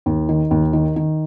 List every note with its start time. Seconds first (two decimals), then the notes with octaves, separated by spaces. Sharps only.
0.06 D#2
0.29 D#3
0.51 D#2
0.73 D#3
0.96 D#3